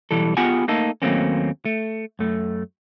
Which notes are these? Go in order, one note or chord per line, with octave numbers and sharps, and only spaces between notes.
B1 E3 G3 A4
B3 F4 G4 G#4 F#5 G#5
A3 A#3 D#4 A4
D#2 F#3 A3 A#3 C4 C#4
A3
F#2 A3